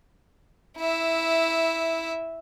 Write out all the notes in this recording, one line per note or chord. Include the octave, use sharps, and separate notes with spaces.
E4 E5